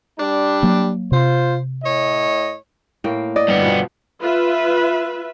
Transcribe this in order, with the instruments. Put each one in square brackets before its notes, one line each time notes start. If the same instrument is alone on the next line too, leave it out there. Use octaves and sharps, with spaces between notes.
[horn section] G3 D4
[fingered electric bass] F#3 A#3
[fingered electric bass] C3 [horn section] F4 C5
[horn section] A2 C#5 D#5
[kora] A2 A#3 G5
[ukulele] D5 [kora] D#5
[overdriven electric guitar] G2 B3
[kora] B2 F3
[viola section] F4 B4 E5